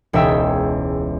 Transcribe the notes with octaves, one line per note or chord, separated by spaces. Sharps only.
E1 C#2 D#4 E5 G5 E6